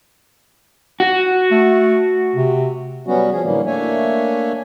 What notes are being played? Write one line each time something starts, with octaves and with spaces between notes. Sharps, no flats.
F#4
A3
C3
F#3 G3 B3 C#4 F#4
F3 C#4 G#4
A2 D3 E3 F#3 G3 A#3
A3 A#3 D4 C#5 E5 G#5